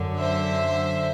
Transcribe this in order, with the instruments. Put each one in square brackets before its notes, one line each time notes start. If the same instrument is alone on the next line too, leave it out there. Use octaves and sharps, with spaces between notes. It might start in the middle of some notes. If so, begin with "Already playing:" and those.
Already playing: [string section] F#2 D3
C5 E5